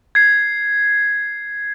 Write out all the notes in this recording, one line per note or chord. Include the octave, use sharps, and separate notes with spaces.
G#6 C7